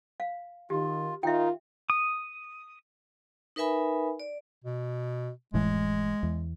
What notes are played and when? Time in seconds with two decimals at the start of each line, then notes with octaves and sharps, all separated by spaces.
0.20 F5
0.70 D#3 F4 G4
1.23 D#3 D#4 F4 E5 G5
1.90 D#6
3.56 D#4 A#4 B4 E5 G#5 B5
4.20 D5
4.64 B2
5.54 F1 A2 E3 G#3
6.23 E2